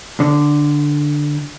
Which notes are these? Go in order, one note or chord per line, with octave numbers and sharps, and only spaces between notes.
D3